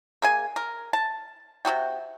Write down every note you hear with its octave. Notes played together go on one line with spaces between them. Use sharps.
A#3 G#4 G#5
A#4
A5
C3 D#4 F#4 G5